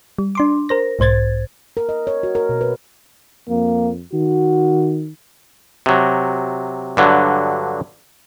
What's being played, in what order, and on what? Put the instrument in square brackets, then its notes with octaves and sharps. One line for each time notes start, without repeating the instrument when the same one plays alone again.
[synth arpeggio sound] G3
D4 C6 D6
A#4 C5 A#6
B1 G#2 C5 G#6 A6
[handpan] A#4
D#5
C#5
F#4
A#4
B2
B4
[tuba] F2 [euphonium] A#3
[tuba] D#3 [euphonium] F#4
[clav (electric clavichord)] C3 F#3
G2 D3 F#3